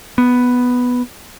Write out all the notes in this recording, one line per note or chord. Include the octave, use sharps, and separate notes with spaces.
B3